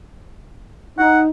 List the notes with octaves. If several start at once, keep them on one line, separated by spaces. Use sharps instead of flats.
D#4 F#5